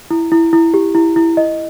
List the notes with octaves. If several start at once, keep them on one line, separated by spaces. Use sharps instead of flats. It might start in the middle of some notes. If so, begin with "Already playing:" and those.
E4
E4
E4
G4
E4
E4
D#5